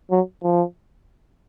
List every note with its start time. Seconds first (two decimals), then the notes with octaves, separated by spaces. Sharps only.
0.11 F#3
0.43 F3